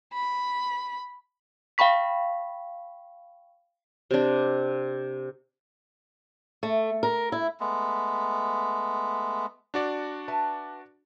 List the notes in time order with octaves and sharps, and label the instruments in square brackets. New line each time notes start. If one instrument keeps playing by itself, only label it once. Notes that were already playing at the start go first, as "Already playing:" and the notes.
[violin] B5
[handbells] F5 G5 B5 C#6 B6
[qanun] C3 D4
[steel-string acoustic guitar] A3
A#4
E4
[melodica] G#3 A3 B3
[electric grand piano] D4 F#4 D5
[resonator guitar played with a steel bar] B4 E5 A5